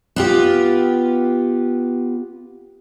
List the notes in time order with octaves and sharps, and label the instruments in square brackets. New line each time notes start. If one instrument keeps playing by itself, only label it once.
[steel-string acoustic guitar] B3 F4 G4